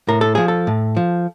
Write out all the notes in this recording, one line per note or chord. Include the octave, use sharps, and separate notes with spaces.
A2 A#4
A4
F3 G#4
A4
A2
F3